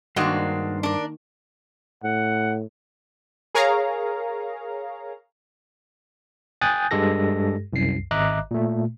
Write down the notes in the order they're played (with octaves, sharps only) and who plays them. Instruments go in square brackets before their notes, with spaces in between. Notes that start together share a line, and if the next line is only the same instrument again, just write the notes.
[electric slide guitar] G2 C5 F5 [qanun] D#3 A#3 [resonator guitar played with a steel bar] G#3 D4 F#4
[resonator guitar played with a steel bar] D4 A#4
[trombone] A2 [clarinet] F#5
[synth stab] G#4 A#4 C#5 F5 A#5
[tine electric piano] G5 G#5 D#6 F#6 G6 A6
G2 G#3 G4 A4 A#6
C2 F#2 C7
G#1 D#5 E5 A#5 D6 F#6
A#2 A3